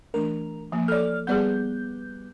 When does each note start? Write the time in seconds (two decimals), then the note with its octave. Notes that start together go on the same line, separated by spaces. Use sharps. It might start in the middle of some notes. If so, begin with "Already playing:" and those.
0.14 E3 A3 D4 A#4
0.72 F3 A#3
0.88 A4 C#5 D5 F6
1.27 G3 B3 G#4 D5 F#5 G6